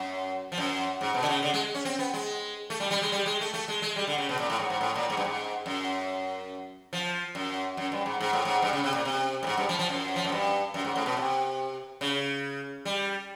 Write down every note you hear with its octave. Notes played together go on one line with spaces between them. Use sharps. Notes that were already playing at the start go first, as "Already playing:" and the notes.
Already playing: F#2
F3
F#2
G#2
B2
D3
C#3
D3
G#3
C#4
C4
B3
G#3
A3
G3
G3
G#3
G3
G#3
A3
A3
G#3
G#3
G3
D3
C#3
B2
A#2
A2
G#2
G#2
A2
A#2
G#2
G2
G#2
F#2
F3
F#2
F#2
G2
G#2
G#2
A2
G#2
G2
C#3
C3
A#2
C3
A2
G#2
G2
F3
F3
F#2
F3
F#2
G2
F#2
G#2
A2
B2
C3
C#3
G3